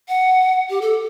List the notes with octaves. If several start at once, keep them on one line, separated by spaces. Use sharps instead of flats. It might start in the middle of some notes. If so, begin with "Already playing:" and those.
F#5
G4
A4